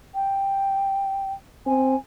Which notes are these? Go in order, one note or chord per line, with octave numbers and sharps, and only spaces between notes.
G5
C4 G#5